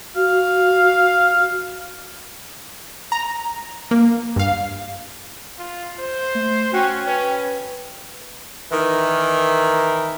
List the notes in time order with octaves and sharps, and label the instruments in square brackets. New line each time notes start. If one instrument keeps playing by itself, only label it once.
[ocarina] F#4 [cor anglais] F5
[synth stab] A#5
A#3
G2 F5
[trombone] F4
C5
[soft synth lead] A3
[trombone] C#4 [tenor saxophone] F#4 [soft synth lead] G5
[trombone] C#4 [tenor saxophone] B4
[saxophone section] D#3 E3 A#4